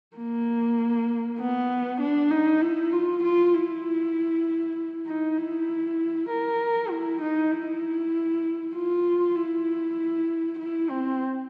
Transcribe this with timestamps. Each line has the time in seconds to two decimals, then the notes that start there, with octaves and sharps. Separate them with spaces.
0.16 A#3
1.39 B3
2.00 D4
2.31 D#4
2.61 E4
2.92 F4
3.23 F4
3.54 E4
5.06 D#4
5.37 E4
6.29 A#4
6.90 E4
7.21 D#4
7.52 E4
8.75 F4
9.35 E4
10.58 E4
10.90 C4